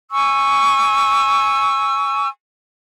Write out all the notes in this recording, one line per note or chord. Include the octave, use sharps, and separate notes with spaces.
G#5 C#6 E6